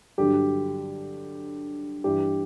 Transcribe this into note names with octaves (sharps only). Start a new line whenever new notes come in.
G2 D3 F#3 G4
G2 E3 G4